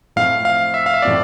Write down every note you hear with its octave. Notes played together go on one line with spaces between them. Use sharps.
A2 F3 C4 F5
F5
E5
F5
E5
A2 F3 C4 D5